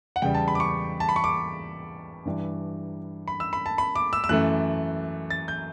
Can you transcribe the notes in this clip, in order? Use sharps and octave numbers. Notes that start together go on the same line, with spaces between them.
F#5
E2 C#3 G3 G5
A5
B5
D6
C#6
A5
B5
C#6
D6
G2 E3 G3
B5
E6
B5
A5
B5
D6
E6
E6
F#2 E3 A3 F#6
A6
G6